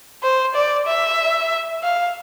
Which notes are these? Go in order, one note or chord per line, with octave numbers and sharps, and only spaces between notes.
C5
D5
E5
F5